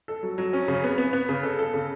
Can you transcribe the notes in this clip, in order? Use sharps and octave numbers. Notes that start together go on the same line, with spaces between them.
A4
F#3
F#3
C#4
C#3
B3
B3
B3
C#3
A4
A4
C#3